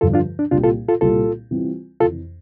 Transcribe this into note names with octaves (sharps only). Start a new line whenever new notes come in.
G2 D3 F3 F4 A4
D4 F4
D4
C2 A#2 G3 D4 F4
F4 A4
F4 A4
C2 A#2 G3 C4 F4 A4
C3 E3 G3 C4 F4
F2 C3 E3 F4 A4